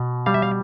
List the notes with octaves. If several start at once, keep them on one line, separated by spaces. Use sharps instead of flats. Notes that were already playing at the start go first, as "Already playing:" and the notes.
Already playing: B2
G3 F5
E5
F5